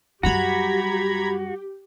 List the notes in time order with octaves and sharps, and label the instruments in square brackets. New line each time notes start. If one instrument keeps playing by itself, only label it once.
[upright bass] F#2 G3 [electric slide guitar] F#4 [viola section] G4 [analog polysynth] A#5 B5 G#6